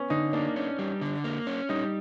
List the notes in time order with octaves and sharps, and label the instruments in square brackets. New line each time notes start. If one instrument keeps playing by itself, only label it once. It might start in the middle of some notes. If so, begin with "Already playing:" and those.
Already playing: [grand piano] B3 C#4
[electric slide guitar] D3 [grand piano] D#4
[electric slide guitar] A#3 [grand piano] D4
[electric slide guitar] C#4
G3
D3
A#3
C#4
[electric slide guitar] G3 [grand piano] D#4